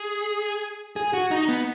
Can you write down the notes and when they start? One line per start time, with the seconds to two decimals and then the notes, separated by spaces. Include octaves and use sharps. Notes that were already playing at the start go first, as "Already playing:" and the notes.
Already playing: G#4
0.96 G#4
1.13 F#4
1.31 D#4
1.48 B3